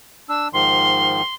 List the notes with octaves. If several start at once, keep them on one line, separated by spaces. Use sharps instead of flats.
D4 E6
G#2 D#3 F3 C6